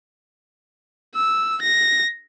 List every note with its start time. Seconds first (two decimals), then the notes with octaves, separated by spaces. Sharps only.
1.16 E6
1.62 A#6